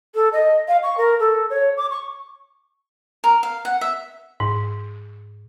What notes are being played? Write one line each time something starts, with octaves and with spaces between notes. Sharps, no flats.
A4
D#5
F5
C#6
A#4
A4
C#5
D6
C#6
A#4
F5
F#5
E5
G#2